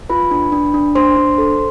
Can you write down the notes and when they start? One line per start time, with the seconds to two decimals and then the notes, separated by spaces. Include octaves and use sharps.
0.09 F4 B4 B5
0.31 D4
0.52 D4
0.74 D4
0.95 D4 C5 C6
1.17 D4
1.38 A4